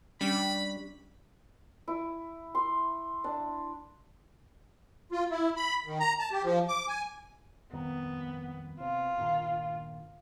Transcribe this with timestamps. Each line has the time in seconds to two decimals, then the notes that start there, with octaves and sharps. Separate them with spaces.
0.21 G3 C#4 D4 B5 C#7
1.88 E4
2.55 C6
3.24 D4
5.12 F4
5.30 E4
5.56 B5
5.86 D#3
6.00 A#5
6.19 A5
6.32 G4
6.43 F3
6.68 D6
6.88 G#5
7.73 D#1 F2 D#3 B3
8.80 C3 F4
9.18 G2 A#2 D#3